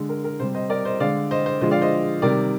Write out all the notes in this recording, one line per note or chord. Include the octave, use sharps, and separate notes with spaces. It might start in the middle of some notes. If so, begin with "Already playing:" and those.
Already playing: D3 G#3
A#4
A#4
C3 G3 C5
C5 D#5
A#4 D5
C5 D#5
D3 G#3 D5 F5
C5 D#5
C5
D3 F3 G#3 C5 D#5
D5 F5
C5 D#5
C3 D#3 G3 A#4 D5